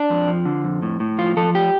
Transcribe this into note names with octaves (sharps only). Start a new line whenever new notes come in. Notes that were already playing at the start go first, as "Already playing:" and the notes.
Already playing: D4
F2
F3
D3
F2
A2
A2
F3 F4
F3 A4
G4